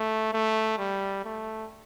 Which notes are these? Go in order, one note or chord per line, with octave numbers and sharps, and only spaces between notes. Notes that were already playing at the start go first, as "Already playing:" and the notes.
Already playing: A3
A3
G3
A3